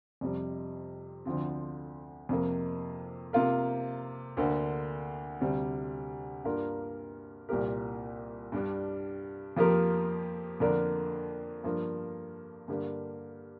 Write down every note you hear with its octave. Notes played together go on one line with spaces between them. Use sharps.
F2 C3 G3
D2 D3 F3 C4
F2 C3 A#3
C3 A#3 F4 A#4
D2 D3 A#3
D2 C3 G3
G2 G3 A#3 F4 A#4
C2 A#2 A#3 G4 A#4
G2 G3 D4
F2 F3 A#3 G4 A#4
F2 D3 A#3 D4 A#4
G2 F3 A#3
G2 D3 A#3 G4